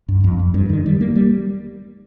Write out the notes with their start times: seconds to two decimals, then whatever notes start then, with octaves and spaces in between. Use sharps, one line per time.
0.08 G2
0.24 F2
0.39 F2
0.54 G2
0.69 D#3
0.86 G3
1.01 A#3
1.15 G3